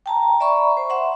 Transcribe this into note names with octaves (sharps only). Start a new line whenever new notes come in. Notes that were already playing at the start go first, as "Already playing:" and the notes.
G5 A5 A#5
D5 E5 A#5 B5 C#6
C5
E5 F#5 C6